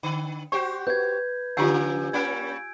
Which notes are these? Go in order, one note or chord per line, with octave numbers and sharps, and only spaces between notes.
D3
F#4 G4 C5 C#6
B4 G6 G#6
C#3 F3 F4 G4 F#5 G#5 E6 G6
G3 A#3 C#4 G#6 D7